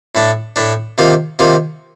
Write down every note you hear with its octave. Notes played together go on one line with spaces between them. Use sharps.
A2 A3 D4
A2 A3 D4
C3 D#3 A#3 F4
C3 D#3 A#3 F4